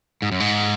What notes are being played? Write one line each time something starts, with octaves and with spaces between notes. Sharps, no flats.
G#2
F#2
G#2